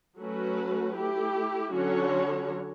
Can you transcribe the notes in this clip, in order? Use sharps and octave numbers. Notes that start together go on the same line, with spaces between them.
F#3 A3 C#4 F#4 B4
A3 E4 G4
D3 F#3 C#4 F#4 C#5